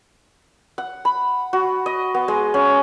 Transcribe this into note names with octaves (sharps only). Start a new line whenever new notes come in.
F#5
B5
F#4
D#5
B3
G#3
C#4